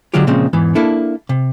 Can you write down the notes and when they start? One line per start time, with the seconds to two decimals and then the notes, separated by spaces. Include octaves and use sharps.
0.14 D3 F#3 G#3 F4 G4
0.27 A#2 C#3 F3 G#3 C4
0.53 E2 G#2 E3
0.75 A#3 D4 E4 A4
1.29 C3